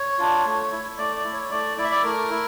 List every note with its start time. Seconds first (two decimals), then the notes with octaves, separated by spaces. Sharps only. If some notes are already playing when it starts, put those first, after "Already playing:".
Already playing: C#5
0.19 D4 F4
0.45 A3
0.72 E4
0.98 A3 D5
1.16 D5
1.24 E4
1.33 C#5
1.51 A3 D5
1.78 E4 D5
1.84 E5
1.92 D5
2.04 A3 A#4
2.31 E4